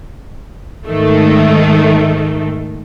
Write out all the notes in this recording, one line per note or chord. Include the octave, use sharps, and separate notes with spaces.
G#2 D#3 A3